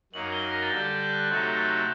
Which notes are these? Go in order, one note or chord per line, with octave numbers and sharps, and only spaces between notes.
F#2 F#3 A#3 D#4 F#7
G7
A#6
A6
D3 G3 D4 G6
G6
G6
F#6
C3 F#3 A3 D#4 A4